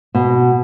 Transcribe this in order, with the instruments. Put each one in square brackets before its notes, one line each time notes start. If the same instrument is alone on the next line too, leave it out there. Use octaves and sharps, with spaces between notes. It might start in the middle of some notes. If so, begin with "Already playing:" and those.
[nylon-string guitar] B2